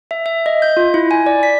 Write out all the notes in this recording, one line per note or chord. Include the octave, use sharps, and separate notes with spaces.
E5
E5
D#5
G6
F4
E4
G#5
D5
B6